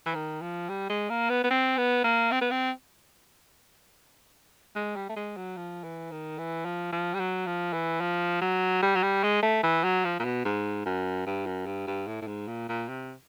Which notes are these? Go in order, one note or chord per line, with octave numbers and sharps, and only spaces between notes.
E3
D#3
F3
G3
G#3
A#3
B3
B3
C4
B3
A#3
C4
B3
C4
G#3
G3
A3
G#3
F#3
F3
E3
D#3
E3
F3
F3
G3
F#3
F3
E3
F3
F#3
G3
F#3
G3
G#3
A3
E3
F#3
F3
A#2
B2
G#2
F#2
G2
F#2
G2
G2
A2
A2
G#2
A#2
A#2
C3